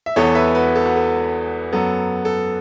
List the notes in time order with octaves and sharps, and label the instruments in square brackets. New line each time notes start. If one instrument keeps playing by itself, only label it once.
[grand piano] E5
E2 E3 B3 A4 C#5
B4 E5
F#4 B4
A4
F#4
A4
F#2 F#3 B3 A4
A4